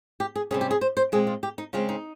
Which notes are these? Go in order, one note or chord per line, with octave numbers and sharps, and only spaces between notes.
G4
G#4
C3 G3 C#4 G#4
G4
G#4
C5
C5
A#2 G#3 C4 G#4
F4
G4
D#4
C#3 G#3 C4 F4
D#4